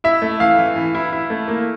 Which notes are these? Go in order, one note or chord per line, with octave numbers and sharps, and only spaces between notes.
E4 E5
A3
E3 F5
E3
E3
E4
E4
A3
A#3